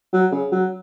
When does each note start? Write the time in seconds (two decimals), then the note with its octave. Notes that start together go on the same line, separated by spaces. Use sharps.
0.13 F#3
0.32 C#3
0.52 F#3